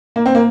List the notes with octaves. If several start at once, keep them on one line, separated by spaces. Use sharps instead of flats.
A#3
C4
A#3